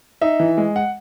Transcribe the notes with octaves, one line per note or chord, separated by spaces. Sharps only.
D#4 E5
E3
G#3
F#5